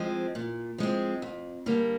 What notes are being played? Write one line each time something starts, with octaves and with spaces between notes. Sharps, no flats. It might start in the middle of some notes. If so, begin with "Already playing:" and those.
Already playing: F3 G#3 C4
A#2
F3 G#3 C4
F2
D3 G3 A#3